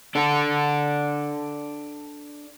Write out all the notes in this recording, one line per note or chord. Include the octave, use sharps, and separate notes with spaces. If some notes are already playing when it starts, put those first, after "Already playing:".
D4 A4